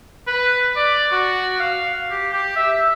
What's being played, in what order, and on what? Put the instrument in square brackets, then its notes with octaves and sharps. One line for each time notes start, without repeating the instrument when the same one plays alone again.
[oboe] B4
D5
F#4
F5
G4
G4
E5